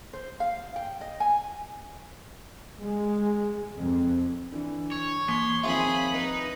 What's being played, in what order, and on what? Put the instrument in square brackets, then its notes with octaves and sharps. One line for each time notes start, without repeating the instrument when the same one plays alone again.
[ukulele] C5
F5
G5
D#5
G#5
[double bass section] G#3
F2
[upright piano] D3 E3
[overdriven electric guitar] C#5
[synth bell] E3 A#3 [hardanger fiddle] C6 [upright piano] B6
[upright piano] D#3 F3 C4 [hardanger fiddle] G#4 B5 [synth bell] E5 F5 C6
[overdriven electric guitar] D#4 [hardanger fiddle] B4